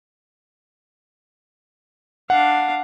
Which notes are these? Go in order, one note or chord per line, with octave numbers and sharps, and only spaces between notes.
D4 F5 F#5